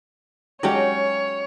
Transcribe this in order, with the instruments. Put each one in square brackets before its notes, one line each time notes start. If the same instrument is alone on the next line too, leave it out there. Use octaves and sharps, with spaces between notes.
[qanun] F#3 C#4 G5 [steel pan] G#3 D4 G4 [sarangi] C#5